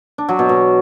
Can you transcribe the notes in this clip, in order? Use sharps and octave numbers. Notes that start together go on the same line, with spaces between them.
D4
F#3
B2
B2